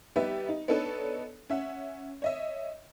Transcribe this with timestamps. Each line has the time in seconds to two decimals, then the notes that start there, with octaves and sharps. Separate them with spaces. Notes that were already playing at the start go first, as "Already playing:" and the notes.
0.16 G3 B3 D#4 G4 B4 E5
0.48 D#4
0.68 B3 D4 D#4 A4 B4 C#5
1.49 C#4 E5 F#5
2.22 C#5 D#5 E5